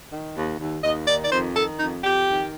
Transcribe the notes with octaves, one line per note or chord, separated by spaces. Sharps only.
D#3
D#2
D#2
D#2 D#5
D#3 D5
D5
F2 C5
D#3 A4
F2 D#4
F2 G4
D#3